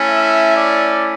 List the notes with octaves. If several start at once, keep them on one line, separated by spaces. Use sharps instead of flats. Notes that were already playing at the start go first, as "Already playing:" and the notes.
Already playing: A3 C#4 E4
E5
D5